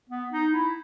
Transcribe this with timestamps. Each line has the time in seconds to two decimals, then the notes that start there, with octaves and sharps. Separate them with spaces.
0.10 B3
0.31 D#4
0.53 E4